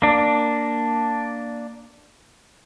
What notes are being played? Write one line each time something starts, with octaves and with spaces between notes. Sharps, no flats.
A#3 D4